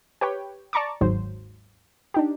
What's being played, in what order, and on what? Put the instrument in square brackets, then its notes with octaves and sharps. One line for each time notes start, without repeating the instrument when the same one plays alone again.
[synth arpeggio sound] G4 B4 C#5 G5
D5 A5 A#5 C#6 D6
G1 D#2 G#2 F#3 C5
D4 D#4 G4